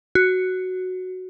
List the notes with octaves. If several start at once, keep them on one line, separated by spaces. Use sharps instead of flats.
F#4